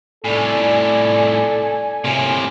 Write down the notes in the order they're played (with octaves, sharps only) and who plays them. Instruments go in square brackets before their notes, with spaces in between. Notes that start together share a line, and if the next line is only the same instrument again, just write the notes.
[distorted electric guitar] C2 A2 [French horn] A4 [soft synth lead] D5 [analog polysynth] G#5
[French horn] A2 [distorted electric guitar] C3 A#3